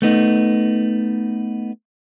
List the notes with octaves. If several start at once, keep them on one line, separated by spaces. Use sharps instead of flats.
A3 B3 D#4